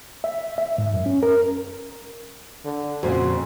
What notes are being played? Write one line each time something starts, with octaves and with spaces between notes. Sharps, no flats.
E5
E5
G#2
F#2
C#4
A#4
D3
F2 A#2 C#3 F#4